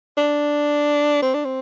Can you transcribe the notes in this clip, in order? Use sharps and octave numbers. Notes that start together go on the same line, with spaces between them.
D4
C4
D4
C4